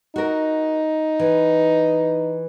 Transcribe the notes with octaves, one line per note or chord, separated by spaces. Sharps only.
D#4 F#4 A#4
E3